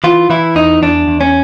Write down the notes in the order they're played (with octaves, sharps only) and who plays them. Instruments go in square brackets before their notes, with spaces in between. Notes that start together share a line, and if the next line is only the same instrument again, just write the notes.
[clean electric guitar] E3 F4
E3 E4
E2 D#4
E2 D4
E2
C#4